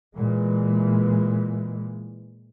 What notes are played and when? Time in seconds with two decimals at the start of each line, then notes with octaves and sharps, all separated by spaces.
0.16 A#2 E3 G#3